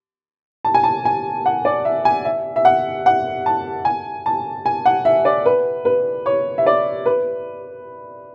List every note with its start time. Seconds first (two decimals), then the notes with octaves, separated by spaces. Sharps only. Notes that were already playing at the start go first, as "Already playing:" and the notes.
0.65 A5
0.74 G#5
0.83 A5
1.05 G#5
1.46 F#5
1.65 D5
1.85 E5
2.05 G#5
2.25 E5
2.56 E5
2.65 F#5
3.06 F#5
3.46 A5
3.85 G#5
4.26 A5
4.66 G#5
4.86 F#5
5.05 E5
5.25 D5
5.46 B4
5.85 B4
6.26 C#5
6.58 E5
6.66 D5
7.06 B4